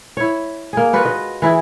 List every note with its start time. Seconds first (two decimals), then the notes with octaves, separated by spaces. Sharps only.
0.17 E4 C#5
0.73 A#3 G#4
0.93 F4 F#4 B4 F#5
1.05 B4 D#5
1.42 E3 E4 G#4